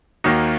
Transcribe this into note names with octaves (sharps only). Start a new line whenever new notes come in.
D#2 D#3 A#3 D#4 F#4